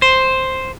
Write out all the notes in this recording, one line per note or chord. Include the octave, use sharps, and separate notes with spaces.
C5